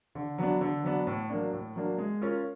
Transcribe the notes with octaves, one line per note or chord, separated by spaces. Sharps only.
D3
F#3 B3 D4
D3
F#3 B3 D4
A2
F#3 A#3 D4
A2
F#3 A#3 D4
G#3
C#4 F4 A#4